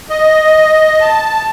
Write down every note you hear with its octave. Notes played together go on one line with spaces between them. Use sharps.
D#5
A5